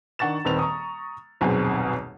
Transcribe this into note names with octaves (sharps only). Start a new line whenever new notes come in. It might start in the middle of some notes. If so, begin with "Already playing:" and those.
D#3 D4 F#5 C#6 A6 E7
D#1 D#3 C4 B4 F7
A#5 C#6 D#6
D#1 B1 F#2 B2 C4 G#4